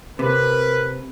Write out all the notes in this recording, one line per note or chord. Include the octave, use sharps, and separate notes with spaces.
C3 A#4 B4